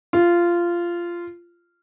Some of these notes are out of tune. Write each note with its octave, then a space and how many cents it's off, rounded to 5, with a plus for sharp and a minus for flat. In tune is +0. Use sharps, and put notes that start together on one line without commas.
F4 -15